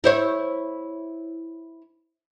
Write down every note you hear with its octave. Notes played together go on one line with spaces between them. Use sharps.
E4 C5 C#5